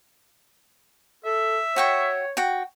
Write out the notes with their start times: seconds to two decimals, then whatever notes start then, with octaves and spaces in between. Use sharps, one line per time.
1.25 A4 E5
1.76 F#4 C#5 G5 C#6
2.37 F#4 G5